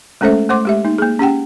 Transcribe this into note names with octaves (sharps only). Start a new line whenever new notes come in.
G#3 A3 C#4 A4 C5 E5
A3 C5 F#5 C6 D6
G#3 G4 E5
A#3 D#4
A#3 G#4
C#4 G4 F#5 G5